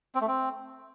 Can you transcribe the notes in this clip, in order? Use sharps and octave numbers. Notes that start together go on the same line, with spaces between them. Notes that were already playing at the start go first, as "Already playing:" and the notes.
C4
A3
C4